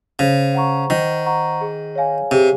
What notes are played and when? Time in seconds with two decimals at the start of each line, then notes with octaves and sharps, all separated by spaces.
0.19 C#3 C5
0.55 F#5 A#5 C#6
0.90 D#3 C5
1.26 F#5 A#5 C#6
1.61 G#4
1.95 C#5 F5 G#5
2.31 C3 G#4